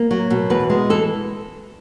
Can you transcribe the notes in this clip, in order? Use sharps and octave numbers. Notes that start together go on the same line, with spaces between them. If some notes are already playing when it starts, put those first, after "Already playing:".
Already playing: A#3
F#3
B2
E2 B4
G#3
E3 A4